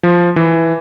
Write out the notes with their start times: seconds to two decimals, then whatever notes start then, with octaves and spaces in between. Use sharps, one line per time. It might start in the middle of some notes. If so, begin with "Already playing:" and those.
0.03 F3
0.36 E3